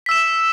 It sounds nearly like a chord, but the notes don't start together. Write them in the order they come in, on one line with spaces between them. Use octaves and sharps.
B6 E6 E7